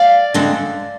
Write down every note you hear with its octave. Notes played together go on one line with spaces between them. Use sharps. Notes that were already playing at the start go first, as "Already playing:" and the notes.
Already playing: D5 F5
D3 G#3 C4